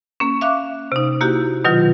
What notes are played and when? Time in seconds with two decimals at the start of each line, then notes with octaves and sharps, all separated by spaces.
0.20 A#3 C#4
0.41 E5 F5 D6 F#6
0.92 C3 D#4
1.21 A#3 E4 F#4 G4
1.64 B2 D#3 F#3 F4